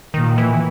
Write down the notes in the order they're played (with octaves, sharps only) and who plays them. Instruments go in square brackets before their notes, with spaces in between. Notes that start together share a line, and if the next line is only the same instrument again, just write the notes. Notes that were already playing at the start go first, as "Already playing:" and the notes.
[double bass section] A#2 [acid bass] D#3
[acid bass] E3